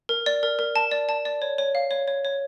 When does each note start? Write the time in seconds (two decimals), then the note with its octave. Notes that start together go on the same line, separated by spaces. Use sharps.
0.09 A#4
0.26 D5
0.43 A#4
0.59 A#4
0.76 A5
0.91 D5
1.09 A5
1.25 D5
1.42 C#5
1.58 C#5
1.75 F5
1.91 C#5
2.08 C#5
2.25 C#5